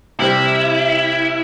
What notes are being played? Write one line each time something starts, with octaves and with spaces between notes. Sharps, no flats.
C3 G3 C4 E4